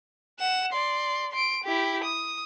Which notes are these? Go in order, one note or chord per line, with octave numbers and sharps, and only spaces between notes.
F#5 E7
D5 C6
C6 D7
E4 G4
D#6